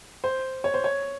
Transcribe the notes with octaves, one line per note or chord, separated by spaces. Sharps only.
C5
C#5
C5
C#5